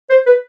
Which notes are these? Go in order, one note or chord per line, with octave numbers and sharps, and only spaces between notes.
C5
B4